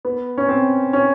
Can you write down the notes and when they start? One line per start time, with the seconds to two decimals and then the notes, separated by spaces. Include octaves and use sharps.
0.05 B3
0.38 C#4
0.49 C4
0.93 C#4